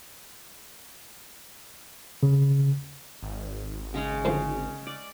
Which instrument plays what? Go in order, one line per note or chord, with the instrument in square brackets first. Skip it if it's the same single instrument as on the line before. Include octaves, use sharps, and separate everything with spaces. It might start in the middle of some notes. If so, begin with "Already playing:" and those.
[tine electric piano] C#3
[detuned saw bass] G#1
[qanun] C#3 G#3 C#4
[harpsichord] D2 A2 F3
[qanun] D5